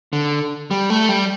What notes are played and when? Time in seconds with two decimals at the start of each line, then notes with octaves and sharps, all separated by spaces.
0.13 D3
0.71 G3
0.90 A3
1.09 G3